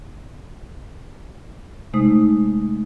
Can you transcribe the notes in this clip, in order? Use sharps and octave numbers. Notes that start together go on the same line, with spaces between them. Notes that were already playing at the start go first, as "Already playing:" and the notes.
C3 G#3 A3 D#4 C5 D#6